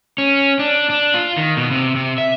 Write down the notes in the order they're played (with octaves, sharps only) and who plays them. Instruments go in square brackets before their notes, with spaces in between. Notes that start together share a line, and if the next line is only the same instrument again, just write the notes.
[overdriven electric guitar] C#4
D4
D4
F4
D#3
B2
C3
C3
E5